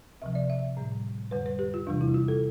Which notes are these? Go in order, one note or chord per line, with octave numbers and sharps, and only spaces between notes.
D2 C3 F3 E5
D5
E5
A2 G3
F2 D3 G3 B4
B4
G4
F4
E2 C3 E3 G3 D4
E4
F4
A4